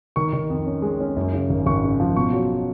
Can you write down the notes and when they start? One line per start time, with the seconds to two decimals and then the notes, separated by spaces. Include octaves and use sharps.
0.16 D#3 C#6
0.33 D#3
0.50 F2
0.66 C#4
0.82 G#3
1.00 C#4
1.16 F#2
1.33 C#3
1.50 G#1
1.66 G#1 C#6
1.83 C#3
2.00 F3
2.16 B2 C#6
2.33 F#3